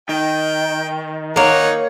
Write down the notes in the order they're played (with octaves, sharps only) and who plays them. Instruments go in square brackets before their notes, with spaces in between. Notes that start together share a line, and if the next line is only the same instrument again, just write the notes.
[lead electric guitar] D#3 [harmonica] G5
[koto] A#3 C#5 [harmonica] D#4 F#5